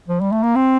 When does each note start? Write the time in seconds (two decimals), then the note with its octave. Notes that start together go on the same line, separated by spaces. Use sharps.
0.08 F3
0.20 G3
0.32 A3
0.43 A#3
0.56 C4